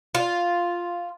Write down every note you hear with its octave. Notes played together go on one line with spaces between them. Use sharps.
F4